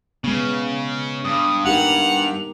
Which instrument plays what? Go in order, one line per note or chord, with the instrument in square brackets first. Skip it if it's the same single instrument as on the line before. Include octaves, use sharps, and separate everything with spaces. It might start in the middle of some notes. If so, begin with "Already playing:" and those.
[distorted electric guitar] C#3 [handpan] G#3 B3
[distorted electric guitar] G2 [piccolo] D#6
[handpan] D#4 G4 A#4 [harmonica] F#5 [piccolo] F7